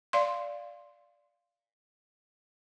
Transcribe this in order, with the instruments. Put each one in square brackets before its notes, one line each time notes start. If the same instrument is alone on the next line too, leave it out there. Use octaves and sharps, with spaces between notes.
[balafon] D5 F5 C6